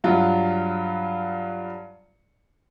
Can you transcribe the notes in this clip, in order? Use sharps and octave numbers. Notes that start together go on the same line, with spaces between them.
G2 F#3 F4